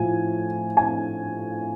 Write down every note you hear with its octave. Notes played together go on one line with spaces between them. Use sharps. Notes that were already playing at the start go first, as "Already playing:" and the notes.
Already playing: A2 F3 G#5
G#5